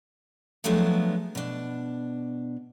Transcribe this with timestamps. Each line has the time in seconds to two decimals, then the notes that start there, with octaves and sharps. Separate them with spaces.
0.64 F3 F#3 G#3 A3 B3 D4
1.35 B2 D4